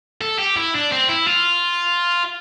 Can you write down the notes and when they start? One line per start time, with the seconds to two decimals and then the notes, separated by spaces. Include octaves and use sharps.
0.21 A4
0.39 G4
0.57 E4
0.74 D4
0.92 C4
1.09 E4
1.27 F4